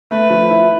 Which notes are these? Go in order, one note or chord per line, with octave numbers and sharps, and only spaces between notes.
A3 B4
F3
E4